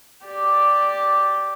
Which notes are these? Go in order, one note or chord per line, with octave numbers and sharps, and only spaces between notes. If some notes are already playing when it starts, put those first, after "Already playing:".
G4 D5